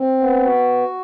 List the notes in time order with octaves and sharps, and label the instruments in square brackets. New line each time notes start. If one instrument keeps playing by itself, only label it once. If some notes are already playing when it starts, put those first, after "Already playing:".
Already playing: [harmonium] C4
B3
F#4